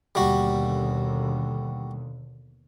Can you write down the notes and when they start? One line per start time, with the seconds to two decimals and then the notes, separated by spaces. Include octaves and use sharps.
0.15 D#2 B2 D3 G3 F#4